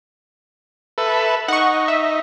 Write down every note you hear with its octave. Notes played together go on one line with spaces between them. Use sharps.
A4 B4 E5
D#4 F#5 C#6
E5